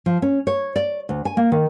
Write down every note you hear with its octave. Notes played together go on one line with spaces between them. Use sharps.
F3
C#4
C#5
D5
D2
G#5
A#3
D#3